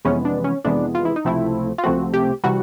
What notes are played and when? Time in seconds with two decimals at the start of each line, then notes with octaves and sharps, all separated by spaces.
0.05 F2 C3 E3 G#3 B3 C#4
0.25 D4
0.44 C#4
0.64 F2 C3 E3 G#3 B3 D4
0.95 F4
1.05 E4
1.16 D#4
1.25 C#2 C3 F3 A3 C4 E4
1.78 F4
1.84 C#2 C3 F3 A3 C4 F#4
2.14 G4
2.44 C3 E3 G3 F#4